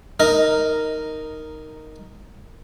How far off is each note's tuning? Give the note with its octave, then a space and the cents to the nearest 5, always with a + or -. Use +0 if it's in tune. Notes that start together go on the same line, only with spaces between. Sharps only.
D#4 +0 A#4 -5